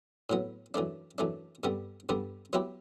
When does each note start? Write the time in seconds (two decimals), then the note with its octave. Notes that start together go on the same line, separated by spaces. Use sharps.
0.30 A2 F#3 B3
0.74 F#2 E3 A3 D4
1.18 F#2 E3 A3 D4
1.63 G2 D3 G3 B3
2.09 G2 D3 G3 B3
2.53 F#3 B3 E4 G4 B4